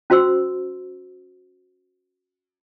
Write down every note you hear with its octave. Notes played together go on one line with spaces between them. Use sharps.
C#4 F#4 C5 C6 E6